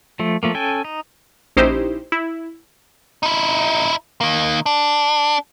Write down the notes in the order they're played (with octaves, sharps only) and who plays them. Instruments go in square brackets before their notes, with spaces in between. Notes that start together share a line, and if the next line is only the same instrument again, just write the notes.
[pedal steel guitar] F3 A3
F3 A3 A#3
C#4 A4 G5 G#5
D#4
[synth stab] A#1 C#4 D#4 E4 G4 C5
E4
[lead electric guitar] D#4 E4
D#3 A#3
D4